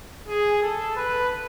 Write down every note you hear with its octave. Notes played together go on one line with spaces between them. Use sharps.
G#4
A4
B4